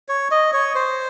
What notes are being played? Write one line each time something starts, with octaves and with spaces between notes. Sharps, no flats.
C#5
D#5
C#5
C5